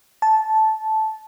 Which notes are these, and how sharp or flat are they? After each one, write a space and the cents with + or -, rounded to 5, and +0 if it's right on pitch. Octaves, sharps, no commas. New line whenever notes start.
A5 -10